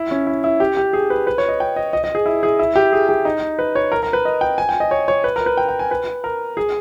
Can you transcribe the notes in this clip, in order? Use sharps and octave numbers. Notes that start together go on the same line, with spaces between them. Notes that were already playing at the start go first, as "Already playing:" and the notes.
Already playing: E4
C#4
E4
E4
G4
G4
G#4
B4
B4
C#5
D#5
G5
D#5
D#5
D#5
G#4
E4
G#4
E4
G4
G#4
G4
D#4
B4
C#5
A#4
A#4
B4
D#5
G5
G#5
G5
D#5
C#5
C#5
B4
A#4
B4
G5
G5
G#5
B4
A#4
G#4